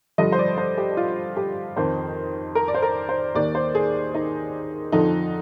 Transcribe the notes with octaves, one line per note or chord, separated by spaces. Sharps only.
G2 D3 F3 D#5
C5
D5
C5
G4
F4
G4
F2 D#3 C5
A#4
D5
C5
A#4
C5
D#2 D#3 D5
C5
G#4
D#4
F2 D3 F3 D#4